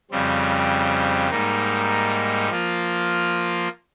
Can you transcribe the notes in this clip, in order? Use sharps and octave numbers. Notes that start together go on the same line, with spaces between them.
F2 C#3 G3 C4
G#2 G3 A#3 D#4
F3 A#3 F4